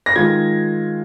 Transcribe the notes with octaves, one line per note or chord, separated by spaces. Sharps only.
A#6
D#3 G#3 F4 G#6